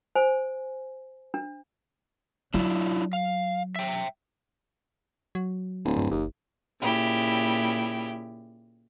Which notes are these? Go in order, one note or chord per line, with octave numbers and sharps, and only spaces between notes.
C5 G#5
D4
F#3 D4 E4 F4
F5
E5 G5
F#3
D1
G2
F#1 D#2
A#2 C#3 E4 G4